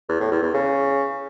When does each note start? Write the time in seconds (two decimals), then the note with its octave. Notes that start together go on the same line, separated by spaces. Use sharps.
0.09 E2
0.20 A2
0.32 E2
0.43 E2
0.54 C#3